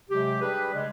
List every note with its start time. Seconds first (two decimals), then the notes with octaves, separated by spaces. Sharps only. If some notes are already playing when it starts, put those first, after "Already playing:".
0.10 C3 F#3 G#3 G4
0.41 G3 D4 G4 G#4 B4
0.74 C#3 G3 G#3